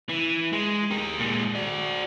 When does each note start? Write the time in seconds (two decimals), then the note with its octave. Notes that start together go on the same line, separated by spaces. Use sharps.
0.09 E3
0.53 G#3
0.91 G4 A#4
1.20 A#2 G#3
1.55 F#4 D5